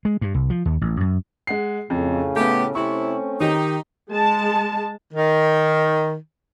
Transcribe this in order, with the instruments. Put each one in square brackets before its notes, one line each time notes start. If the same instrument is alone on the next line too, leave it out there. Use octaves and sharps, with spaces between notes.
[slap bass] G#3
G2
C2
F3
D#2
A1
F#2
[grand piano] G#3 F#5 C7
[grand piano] F2 [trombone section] A2 C#3
[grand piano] A3 B3 [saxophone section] G4
[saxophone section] C3 E4 [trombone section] A3 C4 C#4 [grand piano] C#6
[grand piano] D#3 G4 [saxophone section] D#4
[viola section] G#3 A5
[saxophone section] D#3